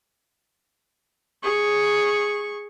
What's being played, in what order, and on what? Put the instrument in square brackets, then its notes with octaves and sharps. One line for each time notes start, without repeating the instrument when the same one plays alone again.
[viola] G#4 C#6